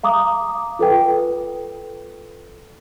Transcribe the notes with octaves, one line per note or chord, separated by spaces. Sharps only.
F5 A#5 D6 D#6
F4 A4 B4 G5